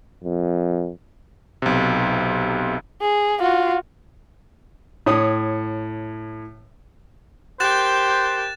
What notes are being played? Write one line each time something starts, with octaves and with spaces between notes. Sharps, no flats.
F2
B1 C3
G#4
F4 F#4
A2 C#5 D#6
G4 A#4 C5 F#6 A6 E7